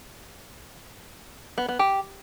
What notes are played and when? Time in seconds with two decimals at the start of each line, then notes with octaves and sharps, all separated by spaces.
1.58 B3
1.69 B3
1.79 G4